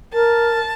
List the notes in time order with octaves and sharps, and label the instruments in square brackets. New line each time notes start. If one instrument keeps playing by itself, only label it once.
[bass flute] A#4 [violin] A5